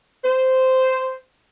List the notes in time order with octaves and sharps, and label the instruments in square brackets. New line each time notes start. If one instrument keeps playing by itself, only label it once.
[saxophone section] C5